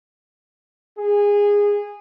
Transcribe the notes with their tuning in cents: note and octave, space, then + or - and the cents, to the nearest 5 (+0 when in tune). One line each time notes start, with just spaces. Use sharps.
G#4 -20